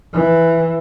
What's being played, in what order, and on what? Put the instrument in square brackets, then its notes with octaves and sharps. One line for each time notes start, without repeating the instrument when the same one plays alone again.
[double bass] E3